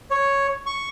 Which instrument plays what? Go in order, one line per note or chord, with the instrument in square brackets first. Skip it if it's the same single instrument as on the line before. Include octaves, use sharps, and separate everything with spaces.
[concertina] C#5
C#6